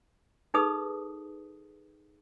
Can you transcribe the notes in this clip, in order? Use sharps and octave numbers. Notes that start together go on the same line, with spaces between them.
D#4 G#4 A4 B4 D#6